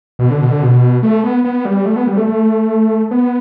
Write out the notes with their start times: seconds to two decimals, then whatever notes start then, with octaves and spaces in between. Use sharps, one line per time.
0.19 B2
0.30 D3
0.41 B2
0.51 D3
0.62 B2
1.03 A3
1.24 B3
1.44 B3
1.65 G3
1.85 A3
1.96 B3
2.07 G3
2.17 A3
2.27 A3
3.11 B3